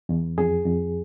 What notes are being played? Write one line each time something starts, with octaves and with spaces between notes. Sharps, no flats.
E2
F2 G#4
F2